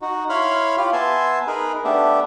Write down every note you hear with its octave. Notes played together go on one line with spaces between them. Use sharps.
D#4 F#4
E4 C#5 F5 B5 C6 F6
F4 G4 F5
B3 E5 G#5 A5 C6
D#4 G#4 A#4 B4
A3 B3 D4 G4 E5